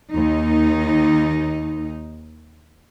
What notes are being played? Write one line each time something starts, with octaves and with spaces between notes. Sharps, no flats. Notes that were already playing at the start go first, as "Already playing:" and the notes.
D#2 D#4